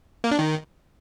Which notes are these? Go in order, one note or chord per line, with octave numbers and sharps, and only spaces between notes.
A#3
D4
D#3